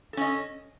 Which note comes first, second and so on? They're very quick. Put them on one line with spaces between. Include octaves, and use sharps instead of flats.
A4 C#4 D#5